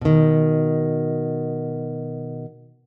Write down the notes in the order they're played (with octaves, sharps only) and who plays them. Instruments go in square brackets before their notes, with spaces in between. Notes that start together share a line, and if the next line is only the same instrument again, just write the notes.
[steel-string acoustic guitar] B2 D#3